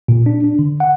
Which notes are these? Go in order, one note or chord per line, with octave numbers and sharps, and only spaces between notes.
A#2
D4
D4
D3
F#5